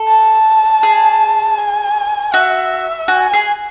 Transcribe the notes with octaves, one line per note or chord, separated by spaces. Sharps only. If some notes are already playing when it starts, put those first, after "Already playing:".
Already playing: A4
A5
G#4
G#5
F#4 E5
F#4 G#5
G#4